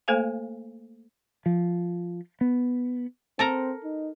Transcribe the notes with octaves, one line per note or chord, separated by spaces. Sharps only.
A3 A#3 A4 C5 F5 G#5
F3
B3
C4 A4 A#4 A#5
D#4